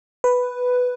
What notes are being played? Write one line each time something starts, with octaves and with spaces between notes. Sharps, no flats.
B4